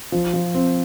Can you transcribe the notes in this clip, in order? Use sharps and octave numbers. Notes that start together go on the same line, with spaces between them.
F3
F3
C4